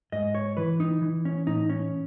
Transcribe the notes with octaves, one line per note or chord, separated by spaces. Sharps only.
G#2 D#5
C#5
E3 B4
D#4
E3
C#4
A2 D#4
C#4